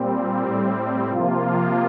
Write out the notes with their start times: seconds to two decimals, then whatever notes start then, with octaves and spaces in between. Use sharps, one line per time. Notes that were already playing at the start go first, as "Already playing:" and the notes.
Already playing: A#2 G3 C4
0.43 A2 G3 C4
1.09 C3 F3 A#3 F4